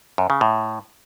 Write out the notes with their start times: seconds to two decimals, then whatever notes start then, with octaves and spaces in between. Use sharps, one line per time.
0.18 F#2
0.30 C#3
0.41 A2